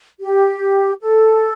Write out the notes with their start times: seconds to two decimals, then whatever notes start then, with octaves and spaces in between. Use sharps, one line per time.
0.20 G4
1.00 A4